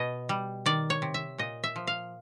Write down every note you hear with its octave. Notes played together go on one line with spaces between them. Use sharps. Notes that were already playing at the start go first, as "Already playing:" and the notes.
Already playing: B2 D#5
G3
D#3 D5
C#5
C3
E5
A#2 D#5
E5
F3
F5